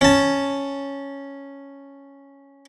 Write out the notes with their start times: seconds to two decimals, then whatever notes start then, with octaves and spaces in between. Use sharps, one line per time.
0.01 C#4 A5